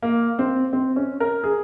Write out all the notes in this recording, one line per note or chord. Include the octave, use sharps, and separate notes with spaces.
A#3
C4
C4
C#4
A#4
G#4